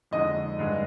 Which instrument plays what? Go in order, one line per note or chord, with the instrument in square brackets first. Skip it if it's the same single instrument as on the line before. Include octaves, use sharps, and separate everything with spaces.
[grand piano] F2 D3 G#3 D#4 [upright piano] D#5
[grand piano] G2 D3 G#3